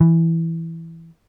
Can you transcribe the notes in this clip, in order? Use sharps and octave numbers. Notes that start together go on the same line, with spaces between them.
E3